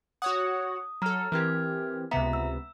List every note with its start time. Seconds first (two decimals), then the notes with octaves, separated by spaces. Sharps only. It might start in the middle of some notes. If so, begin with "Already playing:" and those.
0.22 F#4 C#5 F#5 D#6
1.02 F#3 A4 A#5 F6
1.32 E3 C4 G4 A#4 F6 G#6
2.11 C#2 C3 B3 E5 A#5 B6
2.33 E6